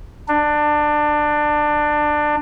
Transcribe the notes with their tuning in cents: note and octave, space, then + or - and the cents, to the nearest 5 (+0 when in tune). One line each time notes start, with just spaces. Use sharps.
D4 +20